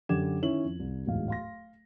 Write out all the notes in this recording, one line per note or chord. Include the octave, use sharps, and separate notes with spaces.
F#2 D3 G4 D6 G#6 E7
D#3 C#4 E4 F#7
F2
C2
D1 E2 G#2 F5
F5 C6 A#6